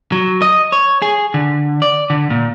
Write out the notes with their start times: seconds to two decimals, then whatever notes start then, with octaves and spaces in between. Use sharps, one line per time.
0.12 F#3
0.42 D#5
0.72 C#5
1.02 G#4
1.34 D3
1.82 D5
2.10 D3
2.30 A#2